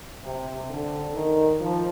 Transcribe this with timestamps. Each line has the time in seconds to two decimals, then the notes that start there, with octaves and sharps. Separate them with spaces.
0.23 C3
0.70 D3
1.15 D#3
1.61 F3